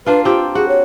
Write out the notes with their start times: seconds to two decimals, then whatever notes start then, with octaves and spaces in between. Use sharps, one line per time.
0.06 A#3 D4 F4 B4
0.25 C4 F4 G4
0.55 F#4 G#4
0.69 C#5